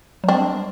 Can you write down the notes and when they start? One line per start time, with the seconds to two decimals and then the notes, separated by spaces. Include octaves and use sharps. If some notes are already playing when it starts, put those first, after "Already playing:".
0.24 F#3
0.29 G3 C4 D4